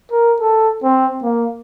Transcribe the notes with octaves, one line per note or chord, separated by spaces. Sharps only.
A#4
A4
C4
A#3